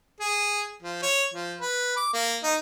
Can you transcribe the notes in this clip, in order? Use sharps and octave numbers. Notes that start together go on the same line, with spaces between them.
G#4
F3
C#5
F3
B4
D6
A#3
D#4